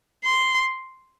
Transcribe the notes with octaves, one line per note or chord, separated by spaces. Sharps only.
C6